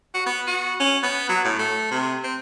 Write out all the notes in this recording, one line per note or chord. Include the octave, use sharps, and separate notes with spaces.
F#4
B3
F#4
C#4
B3
F#3
A2
A3
C3
C4